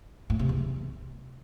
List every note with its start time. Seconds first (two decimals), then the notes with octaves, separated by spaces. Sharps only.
0.30 A2
0.39 C3
0.49 E2
0.59 C3